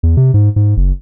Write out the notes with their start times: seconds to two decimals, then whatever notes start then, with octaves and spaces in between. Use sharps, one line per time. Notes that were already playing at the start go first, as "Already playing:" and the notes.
0.03 E2
0.17 C3
0.34 G#2
0.56 G#2
0.77 F#1